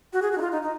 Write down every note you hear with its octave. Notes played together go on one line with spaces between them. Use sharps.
F#4
G#4
F#4
D#4
F4
D#4
D#4